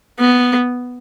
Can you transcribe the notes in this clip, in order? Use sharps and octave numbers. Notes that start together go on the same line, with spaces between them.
B3